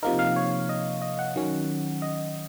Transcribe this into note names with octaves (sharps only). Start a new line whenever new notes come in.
C3 F3 A#3 D#4 A#4
F5
C#5
D#5
D#5
F#5
D#3 F#3 C#4
D#5